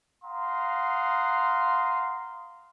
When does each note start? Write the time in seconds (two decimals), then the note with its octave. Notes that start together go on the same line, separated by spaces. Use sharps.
0.24 F5 F#5 A#5 C6 D#6